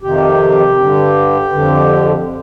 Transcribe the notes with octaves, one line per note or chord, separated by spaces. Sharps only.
F2 C3 D#3 G4
G2 D3
F2 D3